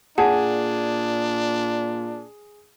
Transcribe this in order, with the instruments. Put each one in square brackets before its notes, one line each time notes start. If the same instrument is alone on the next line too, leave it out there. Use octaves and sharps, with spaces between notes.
[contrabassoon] A#2 [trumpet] D4 [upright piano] G#4 [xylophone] F#5 A5